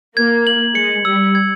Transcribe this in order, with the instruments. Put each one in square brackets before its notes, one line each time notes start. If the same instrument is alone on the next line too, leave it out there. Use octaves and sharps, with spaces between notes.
[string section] A#3 [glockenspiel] G#6
[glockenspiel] F#7
[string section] G#3 [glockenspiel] C#7
[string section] G3 [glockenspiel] E6
[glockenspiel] G#6